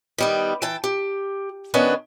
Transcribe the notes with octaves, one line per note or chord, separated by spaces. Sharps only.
D#3 G3 B3
E3 G5 A5
G4
D#3 B3 C#4 D4